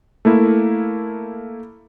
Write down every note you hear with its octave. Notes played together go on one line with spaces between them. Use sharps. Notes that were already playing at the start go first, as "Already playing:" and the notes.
A3 A#3 E4